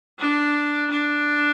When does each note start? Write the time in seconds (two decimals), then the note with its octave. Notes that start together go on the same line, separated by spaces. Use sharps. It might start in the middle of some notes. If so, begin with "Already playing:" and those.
0.19 D4
0.91 D4